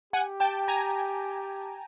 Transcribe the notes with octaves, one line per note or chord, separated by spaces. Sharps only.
G4 F#5 G#5
G5 A5
G#5 A#5